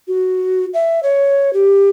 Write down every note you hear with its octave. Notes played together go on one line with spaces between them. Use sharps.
F#4
E5
C#5
G4